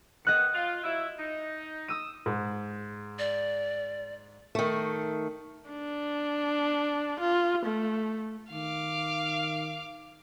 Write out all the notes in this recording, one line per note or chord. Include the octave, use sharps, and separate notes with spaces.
D#3 B3 D#5 F#6 C#7
F4
F#3 E4
D#4
D#6 E6 D#7
G#2
D5
D#3 A3
D4
F4
A3
D#3 F5 D6